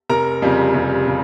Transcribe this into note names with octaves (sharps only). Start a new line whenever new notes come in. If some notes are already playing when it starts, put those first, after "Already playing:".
F1 A#4 A#5
F2 C#3 G3
F1
C#3